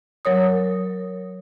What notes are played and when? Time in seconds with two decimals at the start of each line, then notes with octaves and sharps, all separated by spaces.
0.25 F#3 A#4 C#5 D#6